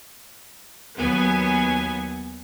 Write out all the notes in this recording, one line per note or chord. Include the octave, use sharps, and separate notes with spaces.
D#2 F#3 B3 G#5